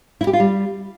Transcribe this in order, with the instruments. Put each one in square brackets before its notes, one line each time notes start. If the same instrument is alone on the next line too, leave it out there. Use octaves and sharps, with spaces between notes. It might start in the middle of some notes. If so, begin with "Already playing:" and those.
[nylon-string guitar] E4
G4
F4
G3